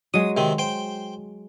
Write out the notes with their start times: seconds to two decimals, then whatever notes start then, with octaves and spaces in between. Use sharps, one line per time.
0.14 F#3 G#3 D#6
0.37 C3 D#3 C4
0.59 C5 G5